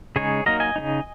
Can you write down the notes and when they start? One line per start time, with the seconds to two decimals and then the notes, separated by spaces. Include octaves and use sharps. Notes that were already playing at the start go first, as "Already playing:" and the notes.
0.16 C#3 G#3 D#4 G#4 C#5
0.46 F#3 A#3 D#4 A#4 D#5
0.60 D#5 G#5
0.76 C#3 A#3 D#4